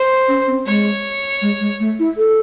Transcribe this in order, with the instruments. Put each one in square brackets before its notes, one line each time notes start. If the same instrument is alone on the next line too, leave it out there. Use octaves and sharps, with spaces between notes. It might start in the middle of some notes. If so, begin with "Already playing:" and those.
Already playing: [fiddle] C5
[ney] C#4
C4
[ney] G#3 [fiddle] C#5
[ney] G#3
G#3
A3
E4
A4